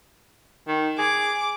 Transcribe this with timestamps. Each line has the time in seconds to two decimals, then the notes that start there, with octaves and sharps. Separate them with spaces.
0.68 D#3
0.98 G#4 D6